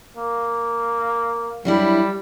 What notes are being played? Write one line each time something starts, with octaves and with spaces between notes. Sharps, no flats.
A#3
F#3 G3 D4 E4